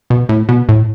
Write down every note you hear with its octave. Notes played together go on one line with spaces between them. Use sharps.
B2
A2
B2
A2